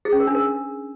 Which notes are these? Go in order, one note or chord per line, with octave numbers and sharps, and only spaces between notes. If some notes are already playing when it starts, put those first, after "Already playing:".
G#4
C#4
A#4
D4
A#4